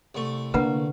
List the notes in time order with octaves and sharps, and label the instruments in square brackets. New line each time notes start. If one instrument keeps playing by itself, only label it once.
[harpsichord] C2 A3
[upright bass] D3 [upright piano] A#3 [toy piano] B4 F#5 A#5